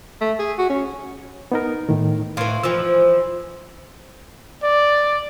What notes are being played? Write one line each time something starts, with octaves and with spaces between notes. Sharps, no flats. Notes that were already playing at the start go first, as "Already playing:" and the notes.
A3
G#4
F#4
C#4
B3 D#4 A#4
A2 D#3
A2 E3 F5 C6
E3 F3 E6
D5